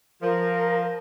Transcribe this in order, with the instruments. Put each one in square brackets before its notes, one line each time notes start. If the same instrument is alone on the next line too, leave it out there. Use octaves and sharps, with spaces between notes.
[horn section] F3 [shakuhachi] A#4